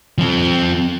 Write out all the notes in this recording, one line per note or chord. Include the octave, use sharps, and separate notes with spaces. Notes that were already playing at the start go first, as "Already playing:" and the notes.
F3 C4